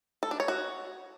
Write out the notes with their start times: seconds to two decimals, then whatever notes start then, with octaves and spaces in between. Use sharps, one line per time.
0.23 A4
0.31 D4
0.40 C#5
0.48 F#4